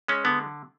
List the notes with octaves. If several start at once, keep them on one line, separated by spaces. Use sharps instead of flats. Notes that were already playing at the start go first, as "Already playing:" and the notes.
G#3 C#4
D3 B3